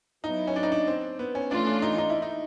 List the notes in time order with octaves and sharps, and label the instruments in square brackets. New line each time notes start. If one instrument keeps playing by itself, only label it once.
[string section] F#3 B3 E4 [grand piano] D#4
[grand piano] C#4
D4
D#4
D4
C4
B3
C#4
[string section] E3 A3 C#4 F4 [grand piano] D4
[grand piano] D4
D#4
D#4
E4
D#4